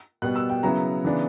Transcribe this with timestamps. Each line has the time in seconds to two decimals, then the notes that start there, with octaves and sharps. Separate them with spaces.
0.22 B2 G3 B3 F#6
0.36 E6
0.49 G5
0.63 C#3 F#3 B3 E4 A#5
1.04 C#3 E3 B3 D4